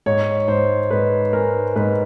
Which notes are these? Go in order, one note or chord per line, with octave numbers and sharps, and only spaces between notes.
G#2 C#5
G#2 C5
G#2 B4
G#3 A#4
G#2 B4